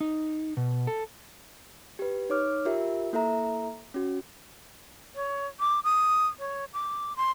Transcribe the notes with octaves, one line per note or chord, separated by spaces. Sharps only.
D#4
B2
A4
G4 B4
D#4 C#5 D6 F6
F4 G4 A#4 E5
A#3 E4 A4 E5 A#5
C#4 F#4
C#5
D6
D#6
C#5
D6
C6